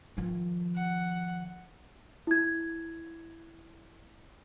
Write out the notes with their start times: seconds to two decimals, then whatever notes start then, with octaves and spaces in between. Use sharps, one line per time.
0.17 D#3 F3
0.75 F#5
2.27 E4 G#6